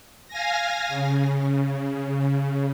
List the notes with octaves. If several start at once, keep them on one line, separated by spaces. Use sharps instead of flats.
F5 G#5 A#6
C#3